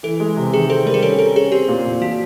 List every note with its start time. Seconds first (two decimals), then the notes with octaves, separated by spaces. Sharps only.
0.03 E3 A4
0.20 G#3
0.37 C3
0.53 D#3 G#4
0.69 C4 A4
0.86 G3 A#4
0.94 G#4
1.03 C#4 A4
1.19 A4 A#4
1.36 C#4 G#4
1.52 C4 G4
1.68 A#2
1.85 A#2
2.01 F3 F#4